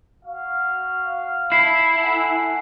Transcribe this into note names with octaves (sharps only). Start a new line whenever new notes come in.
F#4 F5
E4 A5 B5 C7
A3 F#5 G#5